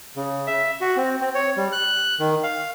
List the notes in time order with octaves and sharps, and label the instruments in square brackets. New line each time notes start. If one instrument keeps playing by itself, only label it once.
[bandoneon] C#3
E5
F#4
C4
C4
C#5
G3
F#6
D#3
F5